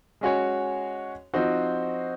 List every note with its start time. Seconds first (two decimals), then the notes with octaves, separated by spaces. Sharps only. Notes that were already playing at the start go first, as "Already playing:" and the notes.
0.21 G#3 C#4 F#4 C#5
1.34 F3 C4 D#4 F#4 C5